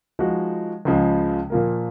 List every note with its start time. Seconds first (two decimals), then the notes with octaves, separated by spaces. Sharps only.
0.19 F3 G#3 D#4 F#4
0.85 C#2 C#3 F3 G#3
1.50 A#2 F3 A#3 F4 A#4